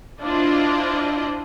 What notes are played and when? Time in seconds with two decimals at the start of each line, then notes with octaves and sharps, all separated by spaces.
0.21 D4 E4 F4 C5 D#5